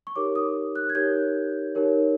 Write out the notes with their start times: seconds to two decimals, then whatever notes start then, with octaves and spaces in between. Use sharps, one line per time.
0.07 C#6
0.16 D#4 G4 A#4 C#5 D6
0.35 D#6
0.76 F#6
0.89 G#6
0.95 D#4 G4 A#4 C#5 G6
1.75 D#4 G4 A#4 C#5